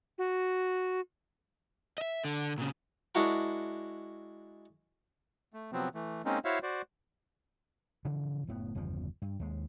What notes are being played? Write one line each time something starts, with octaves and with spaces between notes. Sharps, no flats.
F#4
D#5 E5
D3
A#2 C#3
G#3 D4 E4 F#4 A#4
A3
C3 F3 F#3 B3 C4
E3 A3
G#3 A#3 C4 C#4 D#4
E4 F#4 C5 C#5 E5 F5
F#4 C5 D5
G2 C#3 E3 F3
F#1 A2 C#3 B3
G1 E2 C#3 F3
G2
D#2 G#3